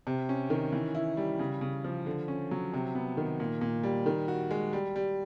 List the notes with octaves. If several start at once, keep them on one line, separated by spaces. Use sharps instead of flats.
C3
C#4
D#3
E3
E4
G3
C#3
C#3
F3
D3
C#4
F#3
C3
B3
D#3
A#2
A#2
G3
D#3
F#4
G#3
G3
G3